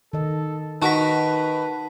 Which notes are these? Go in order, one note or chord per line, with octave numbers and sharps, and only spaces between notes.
D#3 A4 D#5
D#3 D#4 F#4 A#4 B4 A5 B6